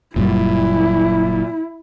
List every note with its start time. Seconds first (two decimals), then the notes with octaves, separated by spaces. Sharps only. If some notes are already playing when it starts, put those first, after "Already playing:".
0.16 F#1 F#2 A#2 G3 E4